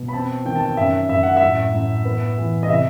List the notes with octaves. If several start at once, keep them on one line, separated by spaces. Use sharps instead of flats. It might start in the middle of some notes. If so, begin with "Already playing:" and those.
Already playing: B2
B5
C4 A5
D#3 G5
A5
G5
F#2 E5
F#2 E5
F#5
E5
A2
A2
B3
E3
D#5
C3 E5